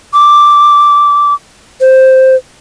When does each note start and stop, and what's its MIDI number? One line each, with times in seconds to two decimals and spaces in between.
0.14 1.34 86
1.81 2.35 72